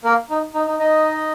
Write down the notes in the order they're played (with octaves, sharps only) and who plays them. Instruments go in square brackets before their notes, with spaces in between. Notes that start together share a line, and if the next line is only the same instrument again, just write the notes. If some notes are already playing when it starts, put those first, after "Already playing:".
[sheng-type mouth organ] A#3 A#4
D#4
D#4
D#4
D#4 D#5